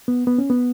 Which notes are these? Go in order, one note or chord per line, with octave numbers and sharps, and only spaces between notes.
B3
B3
C#4
B3